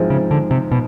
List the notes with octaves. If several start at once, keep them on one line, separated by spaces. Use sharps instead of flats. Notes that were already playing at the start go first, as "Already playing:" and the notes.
Already playing: G#2 F3 G#3 C4 E4
C#3
D3
C3
B2